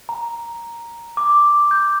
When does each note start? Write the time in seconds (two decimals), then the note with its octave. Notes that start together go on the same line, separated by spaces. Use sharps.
0.09 A#5
1.17 D6
1.71 G6